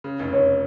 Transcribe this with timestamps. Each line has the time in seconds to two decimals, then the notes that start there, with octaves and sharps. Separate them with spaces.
0.04 C#3
0.19 F1
0.32 F1 C#5